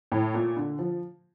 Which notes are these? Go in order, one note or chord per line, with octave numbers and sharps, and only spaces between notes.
A2
A#2
D3
F3